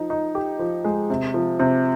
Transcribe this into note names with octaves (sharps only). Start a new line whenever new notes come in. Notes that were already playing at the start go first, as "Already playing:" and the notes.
Already playing: F3 D#4
D#4
G4
F3
G#3
C3
F3
C3